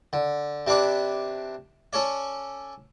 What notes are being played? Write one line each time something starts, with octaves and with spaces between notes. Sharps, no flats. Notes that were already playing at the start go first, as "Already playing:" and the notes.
D3
C3 D4 B4 D6
C#4 A4 C#5 D5